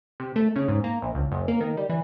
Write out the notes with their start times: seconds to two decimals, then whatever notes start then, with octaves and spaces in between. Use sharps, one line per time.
0.20 C3
0.36 A3
0.56 C#3
0.68 G#2
0.84 A#3
1.02 A#1
1.15 C#2
1.32 F#1
1.48 A#3
1.60 D#3
1.77 G3
1.89 E3